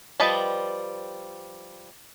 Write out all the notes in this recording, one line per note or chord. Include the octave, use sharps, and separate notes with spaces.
F3 G3 B4 D#5 A5